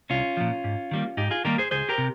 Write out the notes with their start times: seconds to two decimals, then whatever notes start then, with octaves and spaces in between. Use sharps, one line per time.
0.10 C2 C#4 F4
0.37 A#2 F3
0.64 G#2
0.91 D#3 G3 A#3
1.17 G#2 D#4 G4
1.31 F4 G#4
1.45 D#3 G3 A#3 G4 A#4
1.58 G#4 C5
1.71 C#2 G#4 C5
1.89 G4 A#4
1.98 C3